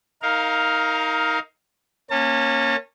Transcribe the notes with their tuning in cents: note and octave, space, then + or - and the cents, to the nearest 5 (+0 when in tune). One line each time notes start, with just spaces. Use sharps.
D#4 +25 A#4 +0 F5 +5
A#3 +0 C#4 -15 A5 +35